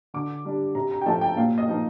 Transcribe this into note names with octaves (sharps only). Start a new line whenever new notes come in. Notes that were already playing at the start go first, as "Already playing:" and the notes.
D3 D6
G3 D4
C3 A#5
A#5
G5
F3 A3 A5
G5
A#2 F5
D#5
F3 A#3 D#4